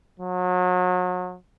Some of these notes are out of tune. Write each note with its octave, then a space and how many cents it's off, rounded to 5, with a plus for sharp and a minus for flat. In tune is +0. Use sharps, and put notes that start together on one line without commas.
F#3 -35